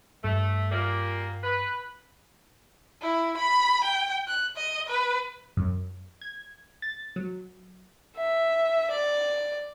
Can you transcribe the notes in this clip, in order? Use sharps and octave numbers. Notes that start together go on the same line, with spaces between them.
G2 A3
A#2 G3 A#3
B4
E4
B5
G5
F#6
D#5
B4
F#2
G#6
A6
F#3
E5
D5